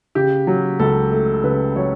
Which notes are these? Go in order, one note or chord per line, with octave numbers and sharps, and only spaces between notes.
C#3 G4
F#3
C#2 A4
A3
C#3 B4
F#3 C#5